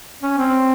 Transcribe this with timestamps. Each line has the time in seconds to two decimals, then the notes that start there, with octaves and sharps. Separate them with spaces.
0.23 C#4
0.38 C4